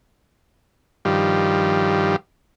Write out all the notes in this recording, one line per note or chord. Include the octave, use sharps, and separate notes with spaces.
G2 D#3 F3 G3